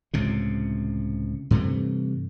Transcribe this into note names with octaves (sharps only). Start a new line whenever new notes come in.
C#2 A2 C3
G2 C3 E3 A3